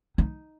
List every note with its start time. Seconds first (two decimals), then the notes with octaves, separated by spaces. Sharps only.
0.18 D#4